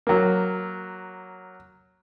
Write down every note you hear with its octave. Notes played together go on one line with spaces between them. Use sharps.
F#3 A#3